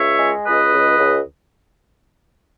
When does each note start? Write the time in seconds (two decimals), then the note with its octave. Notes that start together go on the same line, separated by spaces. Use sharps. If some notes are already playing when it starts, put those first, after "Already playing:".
Already playing: C#2 C#5 E5
0.19 G#3
0.45 C#2 B4 D#5
0.71 C#2
0.96 C#2